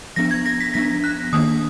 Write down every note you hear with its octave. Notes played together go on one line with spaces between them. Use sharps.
F3 B3 D4 A#6
G#6
A#6
B6
F3 B3 D4 A#6
F#6
D#3 A#3 D4 D#6